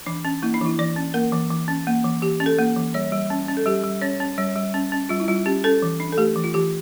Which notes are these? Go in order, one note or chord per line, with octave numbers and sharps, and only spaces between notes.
E3 D4
C#4
A#3 E4
D4
E3 E4
E3 D5
C#4
A#3 A#4
E3
E3
C#4
A#3
E3
E3 G4
C#4
A4
A#3
E3
G3 C#5
G3
C#4
C#4
A4
G3 G4
G3
C#4 C#5
C#4
G3 C#5
G3
C#4
C#4
G3 F4
E4
G3 F4
C#4 G4
C#4 A4
E3
D4
A4
A3 G4
E3
F4
E3 G4